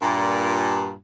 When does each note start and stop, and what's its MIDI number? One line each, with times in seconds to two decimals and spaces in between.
0.02 0.95 43
0.02 0.95 46